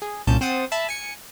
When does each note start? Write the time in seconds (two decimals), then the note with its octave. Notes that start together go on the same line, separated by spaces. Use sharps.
0.02 G#4
0.27 C2 A#2 C#4 A5 G6
0.41 C4 C5 F#5 D#6 A6
0.72 E5 A5 B5
0.89 G#5 C#7